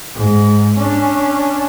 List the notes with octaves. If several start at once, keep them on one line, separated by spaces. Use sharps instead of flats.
G#2
C#4 D4